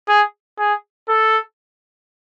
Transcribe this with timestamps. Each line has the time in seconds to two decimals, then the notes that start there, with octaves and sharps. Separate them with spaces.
0.08 G#4
0.58 G#4
1.09 A4